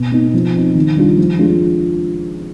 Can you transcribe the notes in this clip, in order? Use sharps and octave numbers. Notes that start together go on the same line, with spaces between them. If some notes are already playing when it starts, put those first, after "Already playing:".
Already playing: B2
B3 D#4
F3
C4 D#4
D#3
G3 D4 F4
F3
G#3 D4 F4